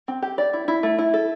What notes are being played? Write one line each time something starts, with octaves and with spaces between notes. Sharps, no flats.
C4
G4
D5
E4
E4
A3
E4
A4